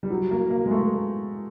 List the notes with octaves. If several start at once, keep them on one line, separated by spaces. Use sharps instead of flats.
G3
F#3
A#3
A#3
G#3
A3